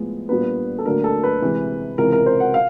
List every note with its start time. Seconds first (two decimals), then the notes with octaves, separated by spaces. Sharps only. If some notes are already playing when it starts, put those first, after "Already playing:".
Already playing: A2 F3 G#3 B3
0.29 A#2 G3 B3 D4 B4
0.79 A4
0.85 D2 D3 F#3 A#3 D4 A#4
1.04 A4
1.23 B4
1.42 C3 E3 G#3
1.98 C#2 C3 E3 A#4
2.12 A#4
2.26 C5
2.40 F#5
2.54 F5